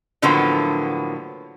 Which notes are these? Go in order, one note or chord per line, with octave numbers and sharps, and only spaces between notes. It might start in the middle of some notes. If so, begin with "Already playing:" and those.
A2 D3 F3 F#3 A#3 B3